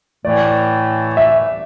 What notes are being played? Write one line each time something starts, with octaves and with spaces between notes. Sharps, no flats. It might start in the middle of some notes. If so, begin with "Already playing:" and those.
A2 E3 A3 D5
E5